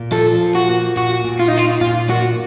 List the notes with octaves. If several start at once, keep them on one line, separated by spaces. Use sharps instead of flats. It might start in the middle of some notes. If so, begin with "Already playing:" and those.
Already playing: A#2
F3 A4
A#2
F#4
A#3
A#2 F#4
A#2
F4
D#4
A#3 F4
A#2 F4
A#3 F#4